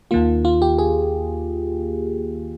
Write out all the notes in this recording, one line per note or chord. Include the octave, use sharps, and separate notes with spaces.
D#2 D#3 A#3 F4
F4
G4
G#4